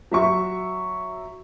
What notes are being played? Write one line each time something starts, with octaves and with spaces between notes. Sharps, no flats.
F#3 E5 C#6